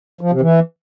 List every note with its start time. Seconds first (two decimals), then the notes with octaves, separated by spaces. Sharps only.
0.21 F3
0.31 C3
0.41 E3